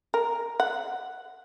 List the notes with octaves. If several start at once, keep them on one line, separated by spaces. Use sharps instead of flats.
A#4
F#5